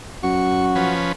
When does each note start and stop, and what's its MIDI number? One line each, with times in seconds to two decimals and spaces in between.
0.23 0.98 42
0.23 0.93 66
0.23 0.65 85
0.75 1.12 53
0.75 1.12 61
0.75 1.12 71